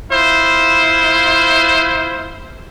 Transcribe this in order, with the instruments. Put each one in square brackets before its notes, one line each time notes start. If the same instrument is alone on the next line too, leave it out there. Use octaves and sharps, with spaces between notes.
[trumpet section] E4 F4 C5